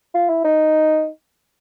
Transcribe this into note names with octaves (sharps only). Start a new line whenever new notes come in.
F4
E4
D#4